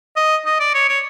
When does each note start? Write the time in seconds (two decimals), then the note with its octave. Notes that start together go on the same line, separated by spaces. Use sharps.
0.16 D#5
0.45 D#5
0.60 D5
0.74 C#5
0.89 C#5